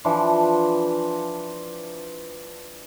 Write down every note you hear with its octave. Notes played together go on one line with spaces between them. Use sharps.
E3 F3 D4 C5